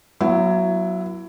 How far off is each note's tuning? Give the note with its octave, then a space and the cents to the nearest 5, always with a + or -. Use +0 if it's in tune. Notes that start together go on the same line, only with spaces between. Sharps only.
F#3 +0 B3 -40 E4 +20